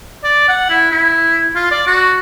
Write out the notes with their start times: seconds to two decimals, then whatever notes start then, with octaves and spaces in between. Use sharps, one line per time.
0.24 D5
0.49 F#5
0.70 E4
0.92 E4
1.56 F4
1.71 D5
1.87 F#4